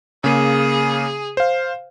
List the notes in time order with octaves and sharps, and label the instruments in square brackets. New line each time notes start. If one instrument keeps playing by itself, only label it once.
[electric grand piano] C#3 A#3 [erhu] G#4
[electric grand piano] C5 F5